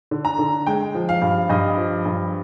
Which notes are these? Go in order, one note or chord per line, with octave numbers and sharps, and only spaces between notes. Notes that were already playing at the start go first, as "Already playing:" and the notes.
D3
A#5
D3
G#3 G5
F3
F5
G2
G2 D#5
F3
G2